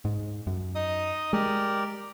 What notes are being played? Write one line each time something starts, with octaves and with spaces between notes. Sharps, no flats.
G#2
F#2
D#4 D#5 D#6
G#3 G4 A#4 D5